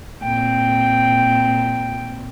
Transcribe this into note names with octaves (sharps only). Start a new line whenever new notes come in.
A#2 C4 G5